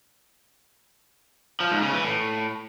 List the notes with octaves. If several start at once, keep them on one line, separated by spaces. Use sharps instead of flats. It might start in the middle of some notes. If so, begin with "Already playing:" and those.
F3
G#2
C#3
E3
A2